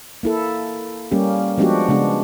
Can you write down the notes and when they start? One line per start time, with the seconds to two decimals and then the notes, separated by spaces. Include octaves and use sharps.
0.23 A#3 E4 A4
1.11 G3 A#3 C#4 G4
1.58 F3 G#3 B3 D4 F#4 G4
1.89 C#3 G#3 B3 D4